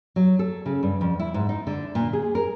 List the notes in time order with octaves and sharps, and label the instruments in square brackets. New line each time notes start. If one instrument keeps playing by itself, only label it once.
[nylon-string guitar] F#3
A4
C#3
G2
F2
E4
G#2
D#4
D3
A#2
G#4
A#4